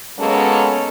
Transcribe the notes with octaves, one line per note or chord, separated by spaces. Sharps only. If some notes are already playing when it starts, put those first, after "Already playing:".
F#3 G#3 A#3 B3 C#4 A4